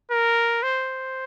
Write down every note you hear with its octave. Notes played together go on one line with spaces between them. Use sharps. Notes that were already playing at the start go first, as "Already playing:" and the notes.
A#4
C5